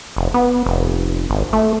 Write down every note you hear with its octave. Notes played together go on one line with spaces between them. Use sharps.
F1
B3
F1
G#1
A3